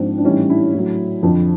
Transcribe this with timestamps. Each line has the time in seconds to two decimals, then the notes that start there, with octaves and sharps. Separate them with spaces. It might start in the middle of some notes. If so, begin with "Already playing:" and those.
Already playing: G#2 F3 C4 D4
0.18 D4
0.24 A2 E3 G3 C#4 D#4
0.49 D4 E4
0.74 A2 F#3
1.23 F2 D3 F3